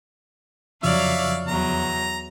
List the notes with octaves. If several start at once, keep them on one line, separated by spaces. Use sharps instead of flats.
F2 C#3 F3 F#3 C#5 D5 E5 F5
E2 F#3 A#5